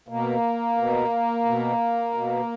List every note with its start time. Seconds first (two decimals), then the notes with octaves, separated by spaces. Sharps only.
0.08 B2 A#3
0.77 B2
1.45 B2
2.14 B2